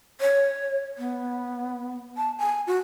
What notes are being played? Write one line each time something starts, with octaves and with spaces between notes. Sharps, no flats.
C#5
B3
A5
G#5
F#4